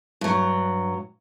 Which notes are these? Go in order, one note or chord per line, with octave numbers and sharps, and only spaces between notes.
G2 F#3